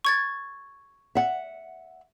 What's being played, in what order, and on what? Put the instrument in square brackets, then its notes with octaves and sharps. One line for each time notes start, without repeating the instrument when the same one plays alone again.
[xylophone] C#6 G#6 A6
[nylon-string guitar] E5 F#5